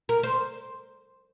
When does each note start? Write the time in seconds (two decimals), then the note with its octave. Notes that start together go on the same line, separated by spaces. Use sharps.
0.09 A#4
0.23 C5